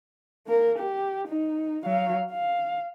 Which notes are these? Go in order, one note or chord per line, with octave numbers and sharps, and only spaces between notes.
A#3 A#4
G4
D#4
F#3 F5
F5